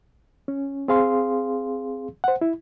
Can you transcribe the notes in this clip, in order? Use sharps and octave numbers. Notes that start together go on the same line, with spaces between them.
C#4
C4 G#4 F5 C6
C5 F#5
E4